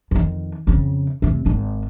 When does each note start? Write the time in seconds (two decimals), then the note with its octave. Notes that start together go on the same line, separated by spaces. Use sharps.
0.11 F2 D#3
0.67 F2 C#3
1.22 F1 C3
1.46 G#1 D#3